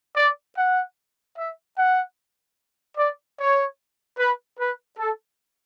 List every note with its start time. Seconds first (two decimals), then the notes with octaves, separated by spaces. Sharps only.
0.15 D5
0.57 F#5
1.36 E5
1.77 F#5
2.96 D5
3.37 C#5
4.17 B4
4.58 B4
4.97 A4